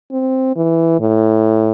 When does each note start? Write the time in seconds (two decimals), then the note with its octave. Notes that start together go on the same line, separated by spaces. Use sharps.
0.12 C4
0.56 E3
1.00 A2